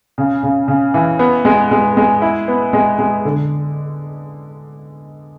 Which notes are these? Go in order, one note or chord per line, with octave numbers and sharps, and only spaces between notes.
C#3
C#3
C#3
E3
B3
G#3
G#3
G#3
E4
B3
G#3
G#3
D3